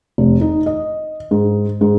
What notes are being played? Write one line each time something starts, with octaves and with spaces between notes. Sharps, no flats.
F1
D#4
D#5
G#2
G#2